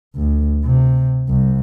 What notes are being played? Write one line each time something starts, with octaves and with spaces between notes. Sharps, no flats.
D2
C3
C2